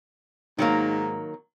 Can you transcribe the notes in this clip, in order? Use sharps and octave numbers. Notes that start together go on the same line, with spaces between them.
G#2 D#3 F#3 A#3